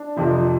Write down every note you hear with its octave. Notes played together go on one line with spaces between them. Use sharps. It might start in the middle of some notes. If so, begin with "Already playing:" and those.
Already playing: D4
F2 C3 F3